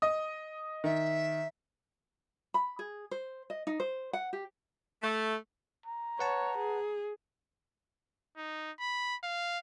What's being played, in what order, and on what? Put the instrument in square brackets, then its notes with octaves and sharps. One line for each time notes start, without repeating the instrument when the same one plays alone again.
[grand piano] D#5 D#6
[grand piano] D#3 [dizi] E5
[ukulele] B5
G#4
C5
D#5
D#4
C5
F#5
G4
[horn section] A3
[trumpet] A#5
[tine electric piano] B4 F#5 A5 [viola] C#5
[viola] G#4
[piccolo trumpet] D#4
B5
F5